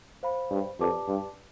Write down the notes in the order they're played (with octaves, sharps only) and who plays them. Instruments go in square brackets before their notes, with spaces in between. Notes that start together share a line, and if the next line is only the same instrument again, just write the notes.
[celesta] C5 F5 B5
[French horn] G2
[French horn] F2 [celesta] G4 B4 D5 A5 D6
[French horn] G2